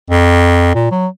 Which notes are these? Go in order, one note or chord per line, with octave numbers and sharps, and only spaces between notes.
F2
A#2
F#3